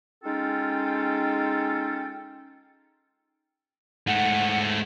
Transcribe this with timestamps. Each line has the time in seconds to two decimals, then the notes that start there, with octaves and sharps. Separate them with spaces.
0.24 G#3 C#4 D#4 F4 A4 G5
4.07 G#2 A3 F#5